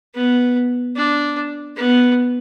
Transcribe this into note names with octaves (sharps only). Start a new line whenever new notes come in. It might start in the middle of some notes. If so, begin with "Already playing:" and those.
B3
D4
B3